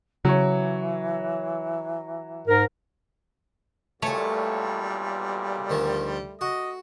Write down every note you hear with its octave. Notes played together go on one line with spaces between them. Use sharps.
C#3 E3 F#3 C#5
G#2 A#4
B1 E2 A#2 G3 A3 C#5 G#5
D2 D#3 F3
F#4 D#5